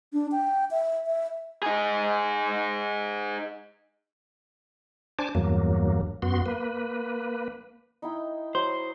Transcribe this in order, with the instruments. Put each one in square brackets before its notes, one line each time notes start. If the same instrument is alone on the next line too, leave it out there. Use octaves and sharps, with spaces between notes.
[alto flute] D4
G5
E5
E5
[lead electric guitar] D#4 G#4
[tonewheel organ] D4 C5 G#5 A5 D6
E2 G2 F#3 A#3
F#2 B3 F#4 C6
A#3 B4
[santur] D#4 E4 G5
[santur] F#3 [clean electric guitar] C5